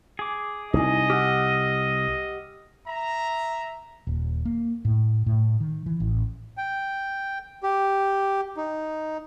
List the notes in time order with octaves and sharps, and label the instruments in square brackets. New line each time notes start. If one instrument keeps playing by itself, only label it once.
[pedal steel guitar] G#4 D6
[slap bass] C2 [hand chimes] D#4 E4 G#5 [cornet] D#5
[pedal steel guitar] G4 F#5 [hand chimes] E6 F6
[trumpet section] E5 A#5
[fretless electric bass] D#1
A#3
A2
A2
D#3
E3
A1
[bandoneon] G5
G4
D#4